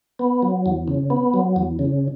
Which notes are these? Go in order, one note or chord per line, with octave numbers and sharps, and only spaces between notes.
B3
F#3
E2
C#3
B3
F#3
E2
C#3